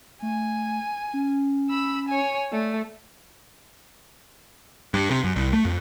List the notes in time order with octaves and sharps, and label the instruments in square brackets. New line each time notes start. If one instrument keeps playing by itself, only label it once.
[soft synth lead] A3 [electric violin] G#5
[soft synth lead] C#4
[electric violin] B5 E6
C#5 G#5
[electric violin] A3 [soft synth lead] D5
[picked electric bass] G2
C3
F#2
C2
A3
F2